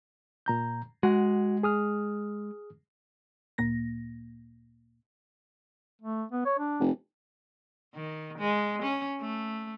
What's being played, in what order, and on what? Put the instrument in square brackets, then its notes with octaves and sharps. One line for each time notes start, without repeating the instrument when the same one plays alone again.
[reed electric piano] A#2 A#5 G6
[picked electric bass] G#3 [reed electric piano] F#4 F#5
[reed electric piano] G#4 D#6 F6
[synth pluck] D2 A#2 A#3 A#6
[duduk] A3
B3
C#5
D4
[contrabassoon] F1
[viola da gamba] D#3
G#3
C#4
A3